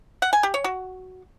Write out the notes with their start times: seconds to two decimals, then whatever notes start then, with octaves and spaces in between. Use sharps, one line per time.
0.22 F#5
0.33 G#5
0.43 G4
0.54 C#5
0.64 F#4